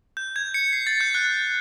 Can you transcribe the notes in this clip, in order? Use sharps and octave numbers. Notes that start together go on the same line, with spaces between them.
G6
G#6
C#7
C7
A6
G6
F#6